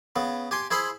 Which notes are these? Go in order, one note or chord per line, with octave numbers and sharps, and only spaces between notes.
C#3 B3
G4 G#5 C6
E4 G#4 C5 B5 C6